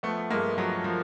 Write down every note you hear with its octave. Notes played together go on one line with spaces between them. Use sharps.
F3 A3 B3
G2 G#3 A#3
F3 F#3
F3